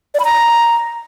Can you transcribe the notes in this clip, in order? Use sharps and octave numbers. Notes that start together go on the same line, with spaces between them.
D5
B5
A#5